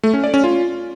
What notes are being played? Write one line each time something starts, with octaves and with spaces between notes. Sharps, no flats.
A3
C#4
D5
C#4
F4